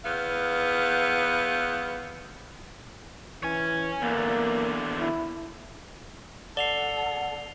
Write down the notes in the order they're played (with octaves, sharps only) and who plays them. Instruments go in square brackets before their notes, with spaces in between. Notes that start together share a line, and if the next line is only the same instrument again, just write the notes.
[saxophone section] E2 B3 F5
[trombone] E3 [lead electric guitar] C#5 G#5
[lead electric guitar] E2 D3 [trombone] A#3
[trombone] E4
[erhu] A4 [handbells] D5 [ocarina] F#5 [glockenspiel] C7 F7 G7